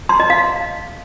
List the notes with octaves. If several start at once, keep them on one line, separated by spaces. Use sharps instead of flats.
C6
D#5
F5